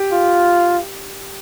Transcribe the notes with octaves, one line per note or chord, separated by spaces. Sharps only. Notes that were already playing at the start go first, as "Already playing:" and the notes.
Already playing: G4
F4